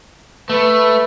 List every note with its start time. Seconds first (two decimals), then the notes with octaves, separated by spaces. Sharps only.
0.49 A3 B4